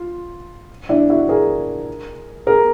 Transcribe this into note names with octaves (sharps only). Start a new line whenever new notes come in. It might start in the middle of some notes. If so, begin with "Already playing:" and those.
Already playing: F4
D4 E4
E4 F#4
G#4 A#4
G#4 A#4